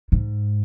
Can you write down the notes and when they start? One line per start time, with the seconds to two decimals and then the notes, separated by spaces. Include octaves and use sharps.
0.12 G#2